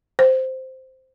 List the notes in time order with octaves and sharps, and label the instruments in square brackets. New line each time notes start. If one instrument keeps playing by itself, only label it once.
[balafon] C5